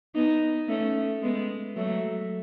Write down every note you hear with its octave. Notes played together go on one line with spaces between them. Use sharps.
B3 D#4
A3 C#4
G#3 B3
F#3 A3